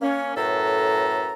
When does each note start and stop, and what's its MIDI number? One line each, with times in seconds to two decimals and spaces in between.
0.02 0.33 58
0.02 0.33 61
0.36 1.33 42
0.36 1.33 45
0.36 1.33 69
0.36 1.33 71
0.36 1.33 82